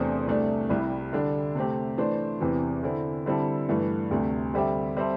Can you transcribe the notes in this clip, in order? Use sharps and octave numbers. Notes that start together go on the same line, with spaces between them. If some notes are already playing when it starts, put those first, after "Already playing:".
Already playing: E2 C3 A3 D4 C5
C2 C3 A3 D4
C2 C3 G3 E4
D3 G3 D4
C3 A3 C4 G4
E3 A3 D4 C5
E2 C3 E3
D3 C4 E4
D3 G3 C4 E4 A4
G2 E3 A3
D2 C3 A3
D3 G3 C4 G4 E5
G3 C4 A4 C5 E5